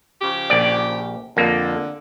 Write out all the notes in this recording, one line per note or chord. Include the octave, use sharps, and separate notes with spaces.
C#3 F3 G4
A#1 D5
F2 D3 A#3